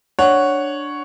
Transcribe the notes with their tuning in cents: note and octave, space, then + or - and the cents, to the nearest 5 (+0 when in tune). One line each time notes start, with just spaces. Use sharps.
D4 +0 C#5 +0 F#5 +0